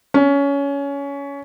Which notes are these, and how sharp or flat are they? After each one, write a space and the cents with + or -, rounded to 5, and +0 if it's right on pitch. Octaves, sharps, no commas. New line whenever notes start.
C#4 +20